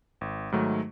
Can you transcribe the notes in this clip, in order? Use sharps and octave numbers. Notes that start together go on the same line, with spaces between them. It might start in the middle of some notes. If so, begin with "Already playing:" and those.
G#1
G#2 D#3 F#3 A3